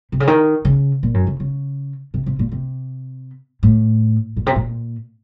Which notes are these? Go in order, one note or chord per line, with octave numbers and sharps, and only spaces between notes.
C3
C#3
D#3
C#3
A#2
F#2
C#3
C#3
C3
C3
A#2
C3
A2
A#2
C3
A#2